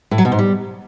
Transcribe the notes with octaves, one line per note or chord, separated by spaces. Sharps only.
A2
F#3
B2
G#2
G3